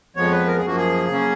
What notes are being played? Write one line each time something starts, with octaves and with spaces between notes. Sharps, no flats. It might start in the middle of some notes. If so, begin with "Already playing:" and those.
F2 F3 G#3 B3 C#5
B4
A#4
G#4
F#2 F3 A#3 F#4
G#4
C#3 F#3 A#3 C#4